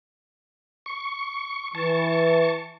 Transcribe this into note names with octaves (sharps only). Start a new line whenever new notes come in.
C#6
E3 A5 C#6